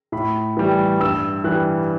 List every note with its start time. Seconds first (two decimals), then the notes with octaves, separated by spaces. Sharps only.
0.12 A2 B5
0.57 E3 G3
1.00 G2 E6
1.44 E3 G3 F#6